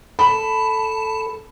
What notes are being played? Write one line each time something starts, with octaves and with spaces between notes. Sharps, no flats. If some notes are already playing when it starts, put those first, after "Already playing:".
A4 A5 B5